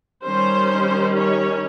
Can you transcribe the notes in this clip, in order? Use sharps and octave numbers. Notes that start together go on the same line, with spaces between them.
D#3 G3 C#4 C5
C#5